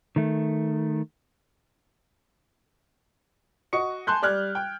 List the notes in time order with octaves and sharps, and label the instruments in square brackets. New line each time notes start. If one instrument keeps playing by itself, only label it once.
[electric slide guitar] D#3 A3
[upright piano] F#4 D#5 C#6 C#7
G#5 A5 C6 F#6 G6
G3 D5 F6 F#6 G#6
G5